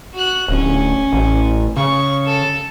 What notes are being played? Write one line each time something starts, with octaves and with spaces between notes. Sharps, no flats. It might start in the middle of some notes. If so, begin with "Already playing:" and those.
F#4 F#6
D1 C#4
A1
C#3 C#6
A4 A5